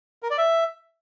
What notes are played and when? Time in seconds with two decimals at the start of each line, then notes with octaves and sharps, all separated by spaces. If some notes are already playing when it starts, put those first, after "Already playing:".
0.23 A#4
0.30 D5
0.38 E5